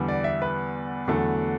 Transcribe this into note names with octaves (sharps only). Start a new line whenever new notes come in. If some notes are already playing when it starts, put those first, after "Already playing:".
Already playing: E2 D3 G3 B3
D5
E5
B4
E2 D3 F#3 A3